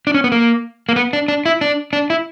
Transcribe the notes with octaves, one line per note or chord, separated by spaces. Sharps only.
D4
C#4
B3
A#3
A#3
B3
D4
D4
E4
D4
D4
E4